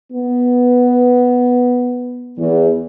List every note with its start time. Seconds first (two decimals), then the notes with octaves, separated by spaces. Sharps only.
0.12 B3
2.37 E2